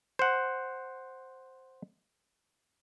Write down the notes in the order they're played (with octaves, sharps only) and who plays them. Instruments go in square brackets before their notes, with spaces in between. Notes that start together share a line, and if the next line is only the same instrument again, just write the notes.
[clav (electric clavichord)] C5 F#5